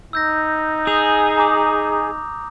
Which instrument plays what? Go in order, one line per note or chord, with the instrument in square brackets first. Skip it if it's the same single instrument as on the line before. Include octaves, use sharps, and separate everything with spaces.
[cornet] D#4 [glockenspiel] E6 G6 A#6
[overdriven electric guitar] G#4 [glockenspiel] D#6 G6 F7
[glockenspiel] A#5 D6 D#6